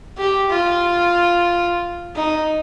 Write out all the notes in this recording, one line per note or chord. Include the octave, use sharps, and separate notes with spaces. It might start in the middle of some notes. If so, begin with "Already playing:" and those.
G4
F4
D#4